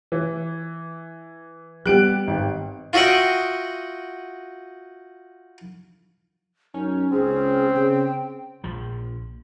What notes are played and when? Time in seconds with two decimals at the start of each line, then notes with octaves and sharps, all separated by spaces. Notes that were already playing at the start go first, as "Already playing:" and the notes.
0.12 E3
1.86 G3 B3 G4 F#6 D7
2.27 G#1
2.93 F4 F#4 D#5 E5 F#5 G5
6.74 F#2 C#4 D#4
7.12 C#2 C4 G#4
7.75 C#3 G5
8.64 A#1 F3